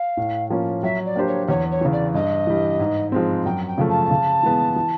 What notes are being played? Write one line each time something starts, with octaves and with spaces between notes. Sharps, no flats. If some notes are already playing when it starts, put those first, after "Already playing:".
Already playing: F5
A2
F3 A#3 C#4 F4
F#3 E5
D5
A#3 D4 G4 C5
C#5
E2 C#5
C#5
C#3 E3
D5
G2 D#5
E3 G3
G#2
F3 G#3 C4
F#2 G5
G5
C#3 F3 A3
A5
C#3
E3 G#3 B3
E3